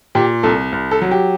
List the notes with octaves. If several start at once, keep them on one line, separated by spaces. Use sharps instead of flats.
A#2 G4
C2 A4
C2
A4
F#3
G4